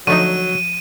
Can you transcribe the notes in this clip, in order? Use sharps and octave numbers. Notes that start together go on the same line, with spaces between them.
D3 F3 F#3 A3 D#4 D#7